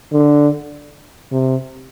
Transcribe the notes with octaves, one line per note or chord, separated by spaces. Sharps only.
D3
C3